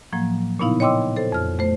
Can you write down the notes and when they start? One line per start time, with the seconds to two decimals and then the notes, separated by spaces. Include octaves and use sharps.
0.13 A2 F3 F#3 A#3
0.59 A#2 C#3 B3 D#4 E4 F5
0.80 C#5 D#5 G5 C6 D6 E6
1.16 A4 C5
1.32 F2 F6
1.59 A3 C5